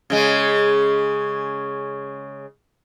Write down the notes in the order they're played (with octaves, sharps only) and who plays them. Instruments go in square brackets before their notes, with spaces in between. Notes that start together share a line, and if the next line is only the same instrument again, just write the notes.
[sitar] C#3 G#3